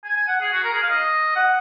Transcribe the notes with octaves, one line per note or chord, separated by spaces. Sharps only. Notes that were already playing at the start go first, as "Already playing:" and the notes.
G#5
G#5
F#5
G#4
F#4
A#4
G#4
F5
D#5
F#5